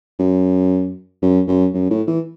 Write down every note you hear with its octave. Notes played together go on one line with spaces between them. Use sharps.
F#2
F#2
F#2
F#2
A2
E3